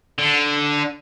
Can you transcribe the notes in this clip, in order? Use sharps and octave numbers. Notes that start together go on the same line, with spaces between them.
D3